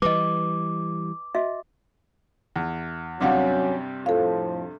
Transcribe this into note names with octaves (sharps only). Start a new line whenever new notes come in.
E3 G3 B4 D#5 D6
F#4 D#5 E5
E2
G2 C3 F#3 G3 C#4 F5 F#5 D6
F2 A2 F3 A4 F5